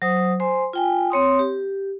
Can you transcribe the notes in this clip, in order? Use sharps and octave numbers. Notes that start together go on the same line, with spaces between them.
F#3 C5 D#6
C5 G#5 C6
F4 G5 G#5
C4 C#5 C6 D#6
G4